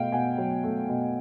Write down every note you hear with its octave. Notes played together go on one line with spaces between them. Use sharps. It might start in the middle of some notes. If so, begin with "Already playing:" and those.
Already playing: B2 A3 F5 G5
B2 F#5 G#5
F#3
A3
B2